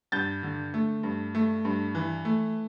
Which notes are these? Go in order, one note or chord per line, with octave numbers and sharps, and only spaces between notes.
G2 G6 A6
D3
A3
G2
A3
G2
E3
A3